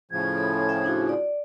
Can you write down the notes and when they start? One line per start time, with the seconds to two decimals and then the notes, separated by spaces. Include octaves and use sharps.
0.11 A2 C#3 F3 G#6
0.38 A4 B5
0.69 E5 G5
0.84 D4 E4 F#4
1.09 D5